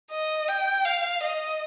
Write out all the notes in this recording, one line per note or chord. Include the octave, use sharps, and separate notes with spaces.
D#5
G5
F5
D#5